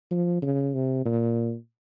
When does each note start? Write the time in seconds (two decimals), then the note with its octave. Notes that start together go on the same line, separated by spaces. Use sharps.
0.11 F3
0.42 C#3
0.74 C3
1.05 A#2